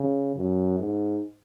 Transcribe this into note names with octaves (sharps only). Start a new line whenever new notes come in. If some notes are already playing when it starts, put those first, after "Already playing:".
Already playing: C#3
F#2
G#2